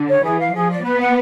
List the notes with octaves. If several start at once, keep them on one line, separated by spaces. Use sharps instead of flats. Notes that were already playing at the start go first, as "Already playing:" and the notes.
Already playing: D3
C#5
E3 G#4
F5
F3 G#4
D5
B3 B4
F#5